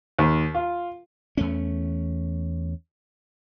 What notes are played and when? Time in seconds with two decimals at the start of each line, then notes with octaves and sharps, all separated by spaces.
0.18 D#2
0.54 F4
1.37 E2 A3 C#4